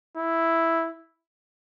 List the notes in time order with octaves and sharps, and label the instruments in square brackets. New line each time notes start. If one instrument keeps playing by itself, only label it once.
[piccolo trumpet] E4